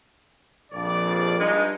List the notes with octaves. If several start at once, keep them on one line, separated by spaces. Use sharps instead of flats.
A#1 F2 D5
G2 G#3 D#4